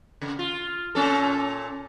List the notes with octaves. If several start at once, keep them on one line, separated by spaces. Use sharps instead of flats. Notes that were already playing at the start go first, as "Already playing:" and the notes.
C#3
F4
A#2 C#4 A4